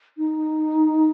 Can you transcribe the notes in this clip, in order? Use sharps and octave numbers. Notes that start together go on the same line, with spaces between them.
D#4